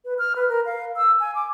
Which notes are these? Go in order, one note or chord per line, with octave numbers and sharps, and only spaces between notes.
B4
F6
B4
A#4
F5
E6
G#5
D6